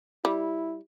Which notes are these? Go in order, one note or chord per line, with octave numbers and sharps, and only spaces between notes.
G3 E4